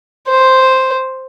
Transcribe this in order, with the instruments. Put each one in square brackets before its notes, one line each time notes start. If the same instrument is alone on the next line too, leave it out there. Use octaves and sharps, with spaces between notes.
[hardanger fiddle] C5